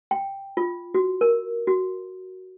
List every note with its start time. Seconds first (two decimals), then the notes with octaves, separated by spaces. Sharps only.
0.11 G5
0.57 F4
0.94 F#4
1.21 A#4
1.67 F#4